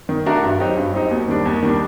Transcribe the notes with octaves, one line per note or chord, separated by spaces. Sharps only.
D#3
A3 D4 F#4 A#4
G2
F#3 C4 D#4 G4
G2
F#3 C4 D#4 G4
D#2
D#3 G3 D4
D#2
D#3 G3 D4